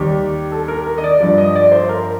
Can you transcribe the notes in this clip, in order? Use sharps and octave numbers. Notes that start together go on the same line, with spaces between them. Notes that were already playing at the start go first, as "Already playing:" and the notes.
Already playing: D#2 D#3 G3 G4
A4
A#4
A#4
D#5
D5
G2 F3 D5
D#5
D5
C5
A#4